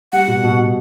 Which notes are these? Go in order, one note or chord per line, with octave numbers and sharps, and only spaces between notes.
G3 F#5
B2
B2
B2